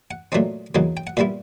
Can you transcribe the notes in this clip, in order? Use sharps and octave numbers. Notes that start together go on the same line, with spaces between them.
F#5
A#2 F#3 A3 C4 D#4
E2 C#3 F#3 A#3 D#4
G5
F#5
A#2 G3 B3 E4 F5